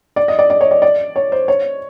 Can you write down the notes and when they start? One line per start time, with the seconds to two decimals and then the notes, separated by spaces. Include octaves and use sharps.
0.16 D5
0.28 D#5
0.39 D5
0.50 D5
0.61 C#5
0.71 D5
0.82 D5
1.16 C#5
1.32 C5
1.48 C#5